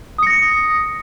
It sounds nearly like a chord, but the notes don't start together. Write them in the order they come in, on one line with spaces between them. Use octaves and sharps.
D#6 C#7 A#6